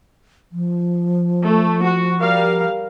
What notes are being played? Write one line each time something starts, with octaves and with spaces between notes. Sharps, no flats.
F3
A3
F#4
G3 A#4 F5